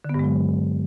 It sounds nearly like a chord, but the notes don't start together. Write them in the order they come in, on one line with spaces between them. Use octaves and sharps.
D3 B3 G2 G#3 F#3